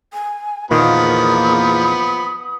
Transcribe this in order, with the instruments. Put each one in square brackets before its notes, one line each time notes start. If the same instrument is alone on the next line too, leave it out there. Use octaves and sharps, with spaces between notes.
[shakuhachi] G#5
[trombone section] E2 A#3 [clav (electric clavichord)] A#2 D#3 [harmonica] F3 B3 B5 [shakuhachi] D#6